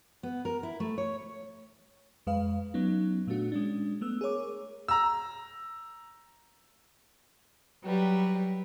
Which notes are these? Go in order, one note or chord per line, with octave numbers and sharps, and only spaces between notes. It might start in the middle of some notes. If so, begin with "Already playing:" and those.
B3
A#4
E4
A3
C#5
F2 G#3 B4 F5
F#3 B3 C#4 D#4
A#2 A3 B3 D4 F#4
G#3 C#4 D4
A3 B3 E6
G#4 A#4 C#5 D6
A#5 E6
F#3 G3 B4